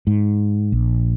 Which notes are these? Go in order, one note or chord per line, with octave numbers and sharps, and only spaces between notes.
G#2
A#1